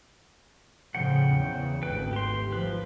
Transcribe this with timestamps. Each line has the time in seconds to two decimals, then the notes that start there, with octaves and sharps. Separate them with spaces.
0.95 A2 C#3 F3 F#5 G5
1.32 E2 C#3
1.83 G#1 D2 B4 G5
2.13 G4 C6
2.53 F3 B4